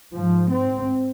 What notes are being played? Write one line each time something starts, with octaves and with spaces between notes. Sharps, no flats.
G#2 F3
C4